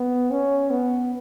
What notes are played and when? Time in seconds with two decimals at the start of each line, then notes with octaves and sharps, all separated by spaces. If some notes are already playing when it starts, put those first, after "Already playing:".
Already playing: B3
0.31 C#4
0.70 B3